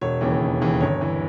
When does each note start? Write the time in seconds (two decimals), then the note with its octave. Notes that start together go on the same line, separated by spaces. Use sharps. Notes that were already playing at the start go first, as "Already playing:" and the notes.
0.01 E1 C#5
0.21 D#2 C#3 E3
0.41 E1
0.61 D#2 C#3 E3
0.81 G1 C#5
1.01 E3